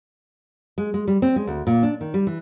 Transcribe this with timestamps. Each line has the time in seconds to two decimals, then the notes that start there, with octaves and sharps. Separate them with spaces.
0.78 G#3
0.94 G#3
1.08 G3
1.22 C4
1.36 G#3
1.47 D2
1.67 A#2
1.83 D4
2.01 D#3
2.14 G3
2.27 E3